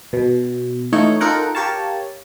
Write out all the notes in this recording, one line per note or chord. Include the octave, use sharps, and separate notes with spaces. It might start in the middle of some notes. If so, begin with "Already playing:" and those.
B2
E3 A3 D#4 F4 C#5
D#4 F4 A4 A#4 F#5 G5
G4 A#4 C#5 F5 A5